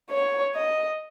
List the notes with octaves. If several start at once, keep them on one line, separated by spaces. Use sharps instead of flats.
C#5
D#5